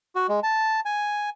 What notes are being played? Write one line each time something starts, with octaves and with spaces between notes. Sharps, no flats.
F#4
G#3
A5
G#5